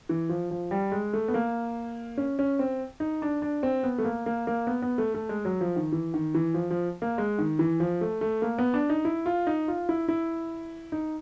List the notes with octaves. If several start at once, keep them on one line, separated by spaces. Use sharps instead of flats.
E3
F3
F3
G3
G#3
A3
B3
A#3
C#4
C#4
C4
D#4
D4
D4
C4
B3
A3
A#3
A#3
A#3
B3
B3
A3
A3
G#3
F#3
F3
D#3
E3
D#3
E3
F3
F3
A#3
G#3
D#3
E3
F3
A3
A3
A#3
B3
D4
D#4
E4
F4
D#4
F4
E4
E4
D#4